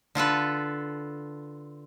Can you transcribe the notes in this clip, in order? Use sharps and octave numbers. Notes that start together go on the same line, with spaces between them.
D3 F4 A4 B4